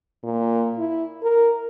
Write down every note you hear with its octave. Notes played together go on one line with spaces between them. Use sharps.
A#2
E4
A#4